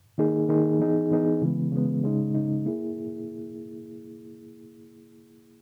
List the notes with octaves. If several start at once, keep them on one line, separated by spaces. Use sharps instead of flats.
D#3 A#3 D#4 G#4
D#3 A#3 D#4 G#4
E3 B3 D#4 G#4
E3 B3 D#4 G#4
C#3 E3 G#3 B3
C#3 E3 G#3 B3
C#3 G#3 D#4
C#3 G#3 D#4
A#3 E4 G#4